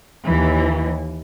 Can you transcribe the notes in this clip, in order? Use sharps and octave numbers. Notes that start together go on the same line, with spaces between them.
D#2 E3